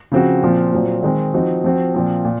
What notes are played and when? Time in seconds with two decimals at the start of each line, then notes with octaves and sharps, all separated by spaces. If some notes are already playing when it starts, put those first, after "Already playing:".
0.12 C#3 F3 C4 F#4
0.43 A#2 F3 C4
0.73 A#2 F#3 C4
1.02 D#3 G#3 C4
1.34 F3 C4 D#4 F#4
1.64 F3 C4 F#4
1.94 A#2 F3 C4
2.25 A#2